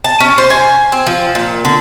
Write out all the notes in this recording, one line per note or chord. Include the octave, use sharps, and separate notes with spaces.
A5
C#4
C5
G#5
C4
F3
A#2
D3